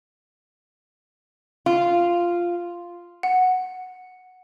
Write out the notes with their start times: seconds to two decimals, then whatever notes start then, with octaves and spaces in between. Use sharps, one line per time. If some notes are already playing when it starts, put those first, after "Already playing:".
1.66 F4
3.23 F#5